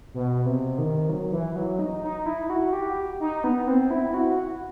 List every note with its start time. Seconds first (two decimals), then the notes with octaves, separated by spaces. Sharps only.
0.14 B2
0.46 C3
0.78 D#3
1.09 F#3
1.32 E3
1.56 F#3
1.79 D#4
2.02 D#4
2.26 E4
2.50 F#4
2.73 G4
3.20 D#4
3.44 B3
3.67 C4
3.90 E4
4.14 F#4